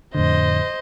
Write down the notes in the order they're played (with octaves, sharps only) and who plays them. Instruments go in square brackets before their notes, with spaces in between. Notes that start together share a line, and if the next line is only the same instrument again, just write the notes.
[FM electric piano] F2 A2 D3 [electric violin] C5 D#5